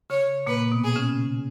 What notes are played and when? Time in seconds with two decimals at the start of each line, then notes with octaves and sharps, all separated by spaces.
0.10 C#3 C#5
0.47 A#2 A#3 B4
0.72 B2 B3
0.84 G#4
0.96 C#3 C#4